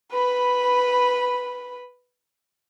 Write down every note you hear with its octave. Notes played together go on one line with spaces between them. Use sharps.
B4 B5